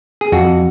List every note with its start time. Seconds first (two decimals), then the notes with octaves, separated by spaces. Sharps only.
0.21 G#4
0.32 F2 F#4